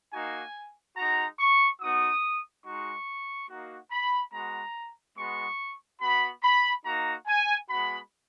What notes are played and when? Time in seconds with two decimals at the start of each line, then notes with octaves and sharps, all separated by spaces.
0.13 A#3 D#4 F#4 G#5
0.97 G#3 D#4 F#4 A#5
1.39 C#6
1.81 B3 D#4 F#4 D#6
2.65 G#3 D#4 F#4 C#6
3.49 A#3 D#4 F#4
3.91 B5
4.33 G#3 B3 F#4 A#5
5.17 G#3 B3 F#4 C#6
6.02 B3 F#4 B5
6.43 B5
6.85 A#3 D#4 F#4 A#5
7.27 G#5
7.70 G#3 B3 F#4 B5